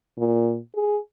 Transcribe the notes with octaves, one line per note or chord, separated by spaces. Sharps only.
A#2
G#4